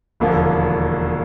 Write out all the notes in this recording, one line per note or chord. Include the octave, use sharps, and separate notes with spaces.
E1 D#2 D3 F3 A#3